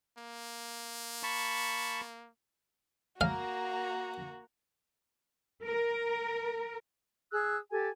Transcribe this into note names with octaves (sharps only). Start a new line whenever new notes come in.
A#3
A5 B5 C#6
A#3 F#4 F5 A#5
A#4
G#4 E6 F#6
G4 A4 G#5